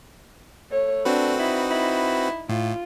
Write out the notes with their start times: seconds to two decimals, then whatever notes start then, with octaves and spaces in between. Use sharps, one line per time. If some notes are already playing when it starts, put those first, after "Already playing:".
0.71 A3 C#5
1.05 C4 D4 F#4 B4
1.39 D#4 E4
1.71 E4
2.49 A2 F4